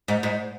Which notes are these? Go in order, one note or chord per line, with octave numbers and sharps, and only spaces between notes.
G#2
G#2